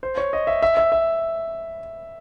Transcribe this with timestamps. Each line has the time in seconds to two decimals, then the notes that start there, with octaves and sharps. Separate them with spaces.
0.03 C5
0.17 C#5
0.33 D#5
0.47 E5
0.62 E5
0.77 E5
0.92 E5